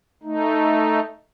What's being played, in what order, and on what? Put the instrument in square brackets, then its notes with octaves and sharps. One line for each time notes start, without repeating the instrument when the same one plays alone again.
[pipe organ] A3 D#4